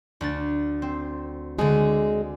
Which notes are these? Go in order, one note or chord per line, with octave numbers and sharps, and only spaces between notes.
D2 D4 A6
C4
D2 D3 G#3 G#4